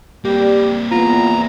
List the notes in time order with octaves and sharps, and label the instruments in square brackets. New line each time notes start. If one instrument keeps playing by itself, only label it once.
[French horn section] G3 [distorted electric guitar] A#3 C4 [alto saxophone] G4
[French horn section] E2 B3 [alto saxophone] F4 [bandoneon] A#5